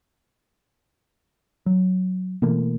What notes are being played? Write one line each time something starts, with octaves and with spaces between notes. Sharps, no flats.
F#3
B2 E3 A3 A#3